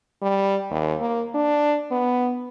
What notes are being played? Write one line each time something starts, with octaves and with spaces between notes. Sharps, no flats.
G3
D#2
A#3
D4
B3